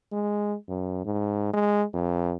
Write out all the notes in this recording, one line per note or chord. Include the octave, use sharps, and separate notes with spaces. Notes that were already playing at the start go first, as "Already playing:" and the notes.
G#3
F#2
G#2
G#3
F2